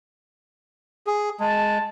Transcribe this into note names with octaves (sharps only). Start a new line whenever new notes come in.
G#4
G#3 A5